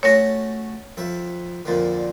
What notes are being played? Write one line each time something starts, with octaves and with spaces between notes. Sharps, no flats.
A3 C#4 F#4 C#5 A#6
F2 E5
F2 A#2 D3